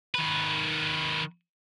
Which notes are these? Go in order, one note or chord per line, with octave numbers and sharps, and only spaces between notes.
D#3 B4